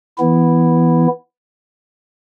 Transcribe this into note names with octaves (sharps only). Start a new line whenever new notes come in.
E3 B3 E4